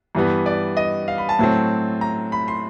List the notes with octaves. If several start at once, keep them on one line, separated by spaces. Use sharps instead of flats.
G2 E3 G3 B3
D5
D#5
F5
B5
A5
A2 F#3 A3 C4
A#5
B5
C6